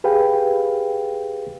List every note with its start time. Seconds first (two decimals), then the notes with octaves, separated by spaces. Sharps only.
0.04 G4 G#4 B4 F5 G5